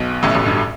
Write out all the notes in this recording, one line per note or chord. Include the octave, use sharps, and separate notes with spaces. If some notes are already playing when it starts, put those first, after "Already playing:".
Already playing: B1 B2
A1 A2
A1 A2
G2